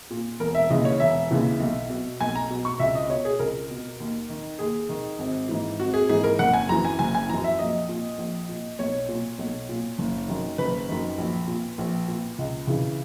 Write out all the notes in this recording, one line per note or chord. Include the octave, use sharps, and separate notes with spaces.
A#2
E1 A#4
E5
D#2 C#3 E3 D#5
C#5
E1 E5
D#2 C#3 E3
B1
B2
B1 G#5
A#5
B2
C#6
C#2 E5
D#5
B2 C#5
G#4
C#2 A#4
B2
D#2
D#3
D#2 G#4
D#3
G#1
G#2 E3
G#1 F#4
G#4
G#2 E3 G#4
A#4
F#1 F#5
G#5
F#2 E3 A#5
G#5
F#1 G#5
G#5
F#2 E3 A#5
E5
A#1 D#5
A#2
A#1
A#2
B1 C#5
A#2
B1
A#2
F#1
F#2 D#3
F#1 B4
F#2 D#3
A#1
A#2
A#1
A#2
C#2
C#3 E3